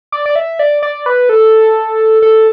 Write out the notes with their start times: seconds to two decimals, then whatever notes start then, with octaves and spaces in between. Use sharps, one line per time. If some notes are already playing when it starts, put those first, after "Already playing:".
0.12 D5
0.26 D5
0.36 E5
0.59 D5
0.83 D5
1.06 B4
1.29 A4
2.22 A4